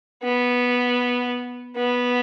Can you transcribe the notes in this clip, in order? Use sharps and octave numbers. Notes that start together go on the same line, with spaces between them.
B3
B3